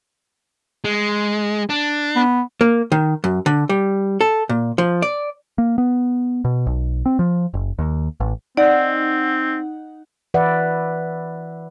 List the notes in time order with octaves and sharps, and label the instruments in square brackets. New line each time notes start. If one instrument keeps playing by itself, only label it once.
[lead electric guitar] G#3
D4
[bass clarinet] B3
[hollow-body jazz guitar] A#3
D#3
F#2
D3
G3
A4
A#2
F3
D5
[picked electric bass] A#3
B3
B2
B1
C4
F3
F#1
D#2
A1
[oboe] C4 [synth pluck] D#4 F#5 [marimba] D5
[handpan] E3 B4 D5 E5 F#5